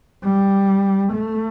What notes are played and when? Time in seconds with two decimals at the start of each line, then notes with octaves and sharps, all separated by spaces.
0.24 G3
1.13 A3